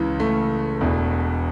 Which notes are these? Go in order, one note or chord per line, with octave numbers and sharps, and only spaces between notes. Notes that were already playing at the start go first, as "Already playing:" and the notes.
Already playing: C#2 C#3 E3
A3
E1 E2 B2